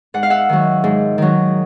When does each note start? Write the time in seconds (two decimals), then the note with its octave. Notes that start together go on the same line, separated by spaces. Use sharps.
0.14 G#2 F#5
0.23 F5
0.30 E5 F#5
0.49 D#3 F#3
0.84 G#2
1.18 D#3 F#3